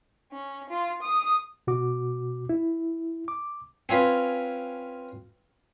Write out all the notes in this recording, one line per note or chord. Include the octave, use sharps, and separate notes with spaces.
C#4
F4
D#6
B2 F#4 D6
E4
D6
C4 C#4 F4 B4